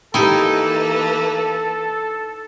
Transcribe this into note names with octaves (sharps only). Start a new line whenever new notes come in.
E3 A#3 D#4 E4 G4 A4 B4 G5